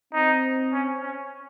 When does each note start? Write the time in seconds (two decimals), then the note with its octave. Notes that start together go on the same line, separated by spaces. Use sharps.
0.13 C4 D#4
0.73 C#4
1.02 C#4